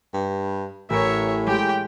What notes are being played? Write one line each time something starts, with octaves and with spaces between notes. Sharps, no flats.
G2
A1 A2 A#4 C#5 E5 C#7
G#3 G4 G5